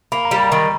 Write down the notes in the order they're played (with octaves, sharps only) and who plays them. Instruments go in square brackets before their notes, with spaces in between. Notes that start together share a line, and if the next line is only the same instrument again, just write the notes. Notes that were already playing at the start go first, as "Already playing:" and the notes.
[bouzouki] A#3 [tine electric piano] B5
[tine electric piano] A#5
[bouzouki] G3
[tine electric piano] B5
[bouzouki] D#3 [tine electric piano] A#5